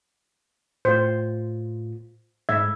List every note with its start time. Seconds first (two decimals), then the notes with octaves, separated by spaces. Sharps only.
0.85 A2 F4 C5
2.49 G#2 E5 G#6